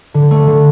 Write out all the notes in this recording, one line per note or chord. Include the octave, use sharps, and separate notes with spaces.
D3
A3
D3